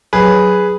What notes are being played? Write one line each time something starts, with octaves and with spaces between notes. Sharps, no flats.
F#3 G#4 B4